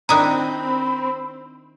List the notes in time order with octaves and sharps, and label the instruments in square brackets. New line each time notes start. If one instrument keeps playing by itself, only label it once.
[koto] D#3 D4 E4 [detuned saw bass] C4 [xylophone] A#5 D#6 F#6 [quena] B5